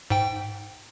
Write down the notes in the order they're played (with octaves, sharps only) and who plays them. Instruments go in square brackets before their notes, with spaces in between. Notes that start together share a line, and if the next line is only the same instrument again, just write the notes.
[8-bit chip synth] G#2 G5